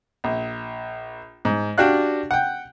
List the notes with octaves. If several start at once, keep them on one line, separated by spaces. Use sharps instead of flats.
A#1
G#2
D4 F#4 G4 D5 F5 F#6
F#5 G5